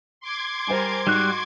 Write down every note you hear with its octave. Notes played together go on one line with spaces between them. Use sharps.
C6 D6 G#6
G3 A#4 C5 G#5
G#2 G3 F#4 F#6